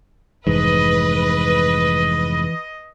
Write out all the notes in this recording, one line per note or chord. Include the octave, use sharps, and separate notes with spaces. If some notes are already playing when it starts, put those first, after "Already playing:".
F1 G#2 E3 B4 D#5